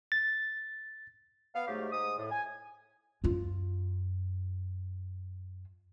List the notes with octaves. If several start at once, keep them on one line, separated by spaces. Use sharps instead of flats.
A6
B3 F5
G#2 F#3 A3 G4
G#2 D#6
A2
G#5
F#2 F4